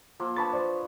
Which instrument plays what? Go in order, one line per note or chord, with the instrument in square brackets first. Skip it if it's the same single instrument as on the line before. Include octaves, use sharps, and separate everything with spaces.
[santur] F3 A#3 E6
[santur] D4 B4 C#5 [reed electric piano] A5 B5 A6
[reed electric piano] C5 D5